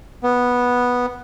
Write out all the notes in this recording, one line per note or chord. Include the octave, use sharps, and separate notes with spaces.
B3